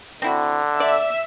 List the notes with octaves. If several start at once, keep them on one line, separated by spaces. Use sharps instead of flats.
D3 C4 E4 F#4
D5 E5